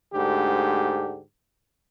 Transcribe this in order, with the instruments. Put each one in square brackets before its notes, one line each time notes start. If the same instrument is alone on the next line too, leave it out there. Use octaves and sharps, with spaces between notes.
[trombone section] D2 G#2 D3 G4